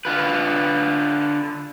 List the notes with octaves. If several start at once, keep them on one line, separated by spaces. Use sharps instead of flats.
D3 F4 B4